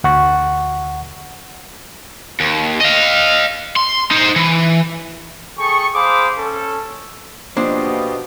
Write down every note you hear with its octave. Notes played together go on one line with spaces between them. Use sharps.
D2 F#5 C#6
D#2
D#5 F5
C6
D#4 C5
E3
G#4 A4 G5 C#6
G#4 C5 F5 B5 D6 D#6
C#4 A4
B2 F3 A#3 D4 F4 G4 C5 D#5